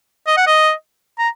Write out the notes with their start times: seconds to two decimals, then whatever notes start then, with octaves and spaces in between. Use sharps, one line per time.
0.27 D#5
0.37 F#5
0.47 D#5
1.19 A#5